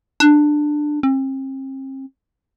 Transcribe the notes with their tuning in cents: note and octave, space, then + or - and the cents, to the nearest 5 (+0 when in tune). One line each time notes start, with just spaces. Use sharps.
D4 +15
C4 +40